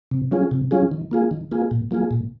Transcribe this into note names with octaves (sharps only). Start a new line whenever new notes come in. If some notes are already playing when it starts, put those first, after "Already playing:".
C3
F#3 C#4 F4 G#4
C3
F#3 C#4 F4 G#4
D#3
A#3 F4 G#4
D#3
A#3 F4 G#4
A#2
F#3 A#3 F4 G#4
A#2